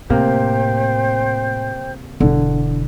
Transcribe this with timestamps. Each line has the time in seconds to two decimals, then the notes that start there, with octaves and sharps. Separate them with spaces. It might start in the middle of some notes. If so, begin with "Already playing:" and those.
0.10 A2 C3 A#3 C5 G5 G6
2.20 E1 D3